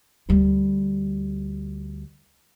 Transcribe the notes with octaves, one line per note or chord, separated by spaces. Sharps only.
D2 G3